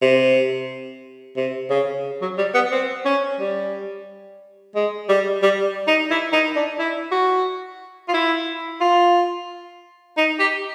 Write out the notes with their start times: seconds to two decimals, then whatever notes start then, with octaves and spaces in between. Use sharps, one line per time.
0.02 C3
1.36 C3
1.70 C#3
2.22 F#3
2.38 G3
2.54 B3
2.71 C4
3.05 C#4
3.40 G3
4.76 G#3
5.09 G3
5.42 G3
5.87 D#4
6.11 E4
6.33 D#4
6.56 D4
6.79 E4
7.11 F#4
8.08 F4
8.14 E4
8.81 F4
10.17 D#4
10.39 G4